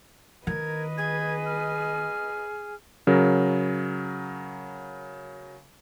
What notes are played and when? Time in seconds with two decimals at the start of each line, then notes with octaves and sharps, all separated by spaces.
0.47 D#3 A#4 B4 D#5 G#6
0.98 G#4 G#6
1.46 F6
3.07 C#3 F#3 A#4